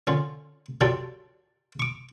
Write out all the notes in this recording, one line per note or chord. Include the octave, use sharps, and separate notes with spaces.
D3 F3 C#4
F3 F#3 D4 G4 A4 D5
C#6 D6